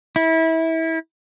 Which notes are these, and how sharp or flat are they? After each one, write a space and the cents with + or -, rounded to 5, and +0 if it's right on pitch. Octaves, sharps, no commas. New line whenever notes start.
E4 -25